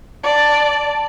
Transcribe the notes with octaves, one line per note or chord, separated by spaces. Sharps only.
D5 A5